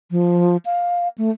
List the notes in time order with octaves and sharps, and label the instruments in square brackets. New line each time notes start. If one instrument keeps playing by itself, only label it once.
[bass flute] F3
F5
A3